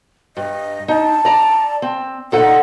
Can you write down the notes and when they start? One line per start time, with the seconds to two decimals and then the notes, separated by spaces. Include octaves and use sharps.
0.37 G2 D#5
0.88 D#4 A5
1.25 D5 A#5
1.82 C4
2.32 A#2 D#4 A4 F#5